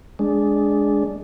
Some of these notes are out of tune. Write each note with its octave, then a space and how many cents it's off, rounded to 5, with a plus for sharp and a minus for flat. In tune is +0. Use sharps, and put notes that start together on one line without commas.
G#3 +0 D4 -10